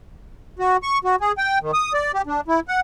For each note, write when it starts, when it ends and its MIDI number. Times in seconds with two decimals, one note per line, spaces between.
0.59 0.77 66
0.83 0.99 85
1.04 1.16 66
1.20 1.32 68
1.38 1.58 79
1.62 1.71 51
1.73 1.93 87
1.94 2.12 74
2.14 2.22 67
2.27 2.41 62
2.48 2.60 64
2.68 2.80 78